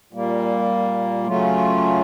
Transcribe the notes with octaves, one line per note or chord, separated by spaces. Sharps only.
A#2 G3 A#3
C#3 F#3 A3 C#4 F4